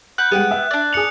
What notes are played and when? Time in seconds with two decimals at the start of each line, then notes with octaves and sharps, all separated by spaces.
0.18 F#5 B5 F#6 G6
0.31 G3 G#3 B3 F#5 G5
0.51 E5
0.71 D4 D5
0.93 G#4 C#7 F7 F#7